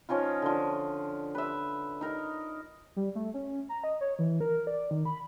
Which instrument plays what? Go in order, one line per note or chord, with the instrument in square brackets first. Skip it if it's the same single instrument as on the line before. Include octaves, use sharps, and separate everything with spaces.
[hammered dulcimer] F3 C#4 D#4 F4
D3 F3
B4 E5
D#4 A#4
[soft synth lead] G3
A3
C#4
A#5
D#5
C#5
E3
A#4
D5
D#3
B5